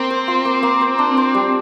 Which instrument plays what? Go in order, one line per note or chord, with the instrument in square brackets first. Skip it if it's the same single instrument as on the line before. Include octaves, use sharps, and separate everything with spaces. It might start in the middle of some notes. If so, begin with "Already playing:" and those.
Already playing: [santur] A#3 [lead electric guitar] C4
[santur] C5
F4
A#3
A#3
C5
D4
C5
G3